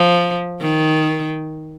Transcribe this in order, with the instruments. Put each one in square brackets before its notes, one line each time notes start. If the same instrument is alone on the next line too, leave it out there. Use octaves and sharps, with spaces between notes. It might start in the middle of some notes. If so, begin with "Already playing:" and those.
Already playing: [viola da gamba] F3
D#3